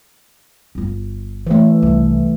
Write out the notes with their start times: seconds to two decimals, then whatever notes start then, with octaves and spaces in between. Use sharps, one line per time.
0.75 G1 F4
1.47 E3 A3
1.82 C2